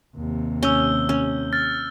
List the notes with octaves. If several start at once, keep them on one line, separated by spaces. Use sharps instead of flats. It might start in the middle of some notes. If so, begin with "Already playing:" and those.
D#2 C3
C#4 E6 G6 G7
C#4
F6 A6